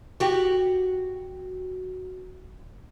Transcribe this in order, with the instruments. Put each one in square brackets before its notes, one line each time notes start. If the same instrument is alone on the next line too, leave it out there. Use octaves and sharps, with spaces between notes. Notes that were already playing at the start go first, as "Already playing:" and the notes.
[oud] F#4 G4